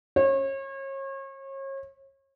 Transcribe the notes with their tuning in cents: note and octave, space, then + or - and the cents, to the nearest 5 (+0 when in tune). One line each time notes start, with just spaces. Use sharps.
C#5 -35